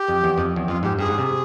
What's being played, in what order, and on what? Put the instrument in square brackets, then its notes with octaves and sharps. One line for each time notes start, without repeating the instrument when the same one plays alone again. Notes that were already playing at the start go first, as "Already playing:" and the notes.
Already playing: [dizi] G4
[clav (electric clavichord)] F2
E2
F2
E2
[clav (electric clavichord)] F2 [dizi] F4
[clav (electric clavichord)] G#2 [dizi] G4
[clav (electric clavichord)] G2 [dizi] G#4
[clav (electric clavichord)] G#2
C3